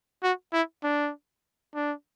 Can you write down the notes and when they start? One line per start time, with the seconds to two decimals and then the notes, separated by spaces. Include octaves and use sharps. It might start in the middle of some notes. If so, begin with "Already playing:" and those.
0.23 F#4
0.53 E4
0.84 D4
1.75 D4